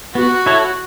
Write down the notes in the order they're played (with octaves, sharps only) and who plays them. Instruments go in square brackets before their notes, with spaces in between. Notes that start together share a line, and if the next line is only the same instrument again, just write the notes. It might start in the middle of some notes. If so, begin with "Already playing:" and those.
[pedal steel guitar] B3 [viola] F#4
[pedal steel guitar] E4 A4 C#5